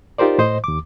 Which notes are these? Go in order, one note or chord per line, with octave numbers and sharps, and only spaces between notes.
D#4 F4 G4 A#4 C5 D5
A2 C5 D#5
D#2 D6